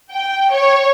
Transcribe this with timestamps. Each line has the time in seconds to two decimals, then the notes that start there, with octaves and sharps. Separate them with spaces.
0.13 G5
0.50 C#5